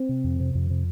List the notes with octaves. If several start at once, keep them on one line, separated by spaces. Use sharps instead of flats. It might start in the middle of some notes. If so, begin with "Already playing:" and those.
Already playing: C4
C3
F2
C3
F2
C3